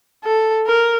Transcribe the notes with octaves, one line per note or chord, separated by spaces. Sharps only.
A4
A#4